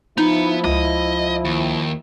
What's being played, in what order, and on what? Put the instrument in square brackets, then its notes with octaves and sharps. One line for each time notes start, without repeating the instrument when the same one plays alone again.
[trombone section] F3 E4 [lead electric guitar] B3 [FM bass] D#4
[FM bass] C#2 [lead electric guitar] D#5
[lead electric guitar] D#2